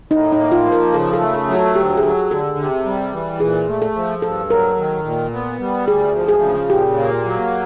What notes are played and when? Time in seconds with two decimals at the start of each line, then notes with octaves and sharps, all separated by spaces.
0.11 A2 D#4
0.32 D#4
0.39 A#3
0.52 F4
0.66 F3
0.72 A#4
0.93 C#3 A4
1.13 A4
1.20 A3
1.34 A4
1.48 F#3
1.55 A4
1.75 D2 G4
1.97 G#4
2.03 F#3 A4
2.30 D3 A4
2.58 C3
2.85 G3
3.13 E3
3.40 A#2 G#4
3.68 A3
3.82 A4
3.96 F3
4.22 G2 A4
4.50 F#3 A#4
4.77 D#3
5.05 A#2
5.33 B3
5.60 G3
5.87 D2 G#4
6.15 F3
6.28 G#4
6.42 C#3
6.70 A#2 G4
6.97 A#3
7.25 F#3